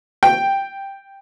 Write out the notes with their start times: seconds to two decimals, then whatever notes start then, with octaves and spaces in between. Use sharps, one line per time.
0.23 G5